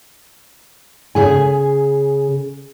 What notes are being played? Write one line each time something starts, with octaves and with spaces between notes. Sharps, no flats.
C#3 G#4 G#5